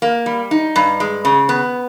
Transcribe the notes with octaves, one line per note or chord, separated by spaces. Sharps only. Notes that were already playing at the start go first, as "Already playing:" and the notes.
A#3
G3
D#4
G2
G#3
C#3
B3